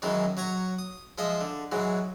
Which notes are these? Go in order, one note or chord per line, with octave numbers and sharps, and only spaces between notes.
F#2 D#3 E3 G#3 D#4
F#3 C#5 A#5 C#6
D#6
F3 G#3 D#5 E5
D3
G#2 E3 F#3 G#3